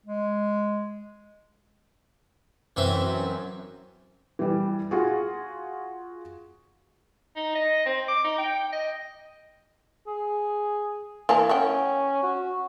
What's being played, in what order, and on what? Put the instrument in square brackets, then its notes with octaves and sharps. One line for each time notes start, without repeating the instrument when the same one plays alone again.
[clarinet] G#3
[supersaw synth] F#2 [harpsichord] E3 C4 E5
[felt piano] E3 G3
F4 F#4 G#4
[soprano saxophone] D#4
D#5
C4
D6
D#4
G5
D#5
[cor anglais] G#4
[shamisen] E3 A#3 A5
[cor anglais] C#4 [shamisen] E5 F#5 G5
[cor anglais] F#4